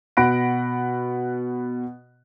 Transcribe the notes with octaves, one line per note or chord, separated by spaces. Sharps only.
B2 F#5 B5 F#6 A#6 D7